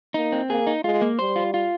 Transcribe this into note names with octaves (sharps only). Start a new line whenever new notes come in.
A#3 D#4
C4
A#3 G#4
D#4
G#3 F4
A#3
G3 C5
F4
F4